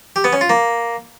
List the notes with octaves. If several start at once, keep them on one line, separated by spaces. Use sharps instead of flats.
G4
B3
C#4
F4
A#3